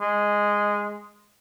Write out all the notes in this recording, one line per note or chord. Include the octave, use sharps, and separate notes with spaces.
G#3